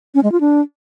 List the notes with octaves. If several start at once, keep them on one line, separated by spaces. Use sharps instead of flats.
C#4
G#3
F4
D4